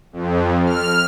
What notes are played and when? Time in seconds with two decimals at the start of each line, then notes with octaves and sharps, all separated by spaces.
0.13 F2
0.66 F6